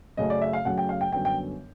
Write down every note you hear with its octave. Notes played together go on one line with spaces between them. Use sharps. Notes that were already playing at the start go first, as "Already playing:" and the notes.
F#2 C#3 F#3 A3 D#5
D5
E5
F5
F#2 C#3 F#3 A3 F#5
G5
F5
G5
G1 F#2 D3 F#3 B3 G5
G5